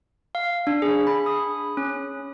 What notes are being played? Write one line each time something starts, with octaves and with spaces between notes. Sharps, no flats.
F5
D4
G#4
B5
D#6
C#4